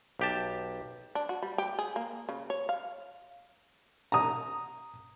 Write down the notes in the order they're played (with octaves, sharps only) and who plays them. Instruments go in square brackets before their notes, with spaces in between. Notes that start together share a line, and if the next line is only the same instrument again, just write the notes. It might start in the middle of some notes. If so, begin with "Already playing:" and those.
[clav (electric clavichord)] B1 G4 A5
[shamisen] D4
F#4
G3
G4
G#4
A#3
C#3
C#5
F5
[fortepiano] A#5 D#6